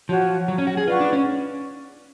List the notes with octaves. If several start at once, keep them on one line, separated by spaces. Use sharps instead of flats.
F3 F#4 C#5 F#5
F#3
C#4
F#4
G#4
F4 B4 D5 F#5 C#6
D4
C#4